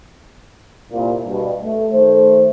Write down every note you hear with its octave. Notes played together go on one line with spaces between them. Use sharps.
C2 A#2
G2 B2
A3
D#3 A3 C5